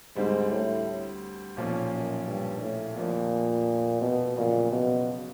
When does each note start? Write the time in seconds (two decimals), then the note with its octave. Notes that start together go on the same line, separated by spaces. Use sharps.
0.16 D2 G#2 D3 G3 C4
0.51 A2
1.57 B1 A#2 F3 A#3 C#4
1.91 F#2
2.26 G2
2.61 A2
2.96 F1 F2 A#2 D3 F3 A#3
4.01 B2
4.36 G1 F2 A#2 C#3 F#3
4.72 B2